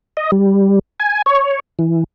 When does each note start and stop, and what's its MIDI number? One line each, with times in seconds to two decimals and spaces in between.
0.17 0.31 75
0.32 0.79 55
1.00 1.22 80
1.26 1.60 73
1.79 2.04 52